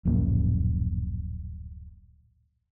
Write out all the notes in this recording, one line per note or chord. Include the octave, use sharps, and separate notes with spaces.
D1 A#1 F#2 A#3